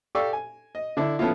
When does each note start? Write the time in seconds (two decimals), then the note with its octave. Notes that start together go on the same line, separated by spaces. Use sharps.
0.15 G4 A4 D5 F5 C#6 E6
0.33 G#5
0.75 D#5
0.97 D3 D4 E4
1.19 F3 A3 B3 C#4 E4 F4